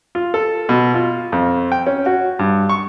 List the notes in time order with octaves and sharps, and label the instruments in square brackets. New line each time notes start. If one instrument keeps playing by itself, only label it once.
[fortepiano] F4
A4
B2
F4
F2
G5
C#4
F#4
G2
C#6